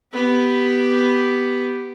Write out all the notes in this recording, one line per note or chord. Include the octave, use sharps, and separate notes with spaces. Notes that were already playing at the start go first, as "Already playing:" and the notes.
B3 G4